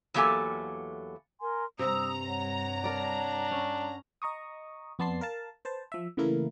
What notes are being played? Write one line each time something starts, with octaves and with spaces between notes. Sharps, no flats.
E2 F#3 A#3 G4 A4 G#5
A#4 G#5 C6
G2 C3 A#5 D#6 E6
C#5 F#5
D4 A#4 D5
C#4
D#5 A#5 C#6 D#6
F2 B3 D5 A5 C6 C7
A#4 F5 A5
B4 C5 A5
F3 E5
C#3 E3 A3 A#3 E4 A#4